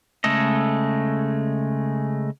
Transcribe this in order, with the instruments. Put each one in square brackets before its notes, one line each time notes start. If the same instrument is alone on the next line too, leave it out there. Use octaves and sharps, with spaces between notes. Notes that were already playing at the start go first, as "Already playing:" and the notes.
[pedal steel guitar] C#3 G#3 A3 A4 D#5